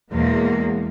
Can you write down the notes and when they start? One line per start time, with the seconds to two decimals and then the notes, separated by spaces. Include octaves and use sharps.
0.11 E2 B2 G#3 A#3